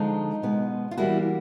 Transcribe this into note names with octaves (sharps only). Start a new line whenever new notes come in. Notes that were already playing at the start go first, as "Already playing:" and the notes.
Already playing: D3 F3 G#3 D#4 F4
B2 G#3 B3
F4
E3 G3 A#3 E4 F#4